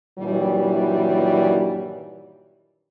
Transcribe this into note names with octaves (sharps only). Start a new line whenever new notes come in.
G2 A#2 D#3 E3 F#3 G3